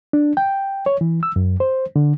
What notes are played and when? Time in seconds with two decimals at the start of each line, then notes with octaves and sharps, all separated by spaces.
0.13 D4
0.37 G5
0.86 C#5
1.01 E3
1.23 E6
1.36 F#2
1.60 C5
1.96 D3